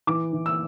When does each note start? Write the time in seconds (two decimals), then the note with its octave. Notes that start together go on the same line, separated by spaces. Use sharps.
0.07 E3 D6
0.33 E3
0.46 E6